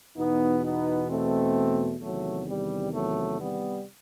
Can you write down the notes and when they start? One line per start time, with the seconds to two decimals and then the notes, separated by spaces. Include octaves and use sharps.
0.16 E2 B2 B3 D#4
0.63 B3 D#4
1.09 A3 C4
2.01 E2 C3 D#3 F#3 A3
2.48 G3
2.94 F#3 A3
3.40 G3 B3